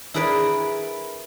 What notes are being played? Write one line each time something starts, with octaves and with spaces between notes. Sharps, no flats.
E4 G#4 A#4 B4 D5